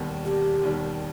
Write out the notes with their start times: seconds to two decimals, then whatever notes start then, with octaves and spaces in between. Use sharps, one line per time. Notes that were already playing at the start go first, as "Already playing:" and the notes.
Already playing: E1 D#2 D#3 G3 B3
0.25 E1 G4
0.63 D#2 D#3 G3 B3